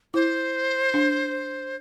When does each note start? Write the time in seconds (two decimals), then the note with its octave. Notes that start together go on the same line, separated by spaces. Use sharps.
0.14 E4 C5
0.94 D4